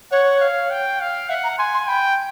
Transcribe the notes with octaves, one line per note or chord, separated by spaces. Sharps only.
C#5 F#5
F5
G5
F5
E5 F#5
A#5
G#5 C6
C6
G5 B5